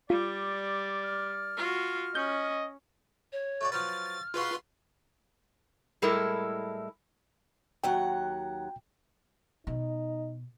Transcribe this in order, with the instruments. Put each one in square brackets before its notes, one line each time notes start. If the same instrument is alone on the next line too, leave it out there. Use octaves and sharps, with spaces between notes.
[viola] G3 [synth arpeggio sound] F4 [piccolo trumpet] D5
[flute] F6
[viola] F4 F#4
[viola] C#4 [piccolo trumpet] D#5 [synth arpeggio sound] G6
[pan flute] C#5
[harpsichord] A3 F#4 D5
[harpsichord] F3 F#3 B4 [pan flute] F6 [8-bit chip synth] A6
[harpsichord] G#3 F#4 [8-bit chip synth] F4 B4 C6
[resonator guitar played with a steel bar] A2 G3 G#3 E4 A4 A#4
[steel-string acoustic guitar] D#2 F#3 F#5 [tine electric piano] G5
[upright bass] B2 [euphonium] D#4